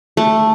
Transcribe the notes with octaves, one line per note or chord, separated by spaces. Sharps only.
A3